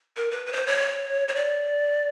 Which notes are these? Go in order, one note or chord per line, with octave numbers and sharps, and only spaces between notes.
A#4
B4
B4
C#5
C5
C#5
C#5
D5